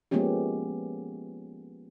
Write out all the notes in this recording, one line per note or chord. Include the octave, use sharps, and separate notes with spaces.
F3 G#3 A#3 B3 C#4 G4